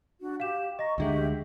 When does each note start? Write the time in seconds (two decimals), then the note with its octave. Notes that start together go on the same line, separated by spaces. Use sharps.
0.21 D4 F#4
0.40 G4 F5 E7
0.79 D#5 A#5 C#6 A#6
0.98 D2 D3 G#3 F#4 G4 E5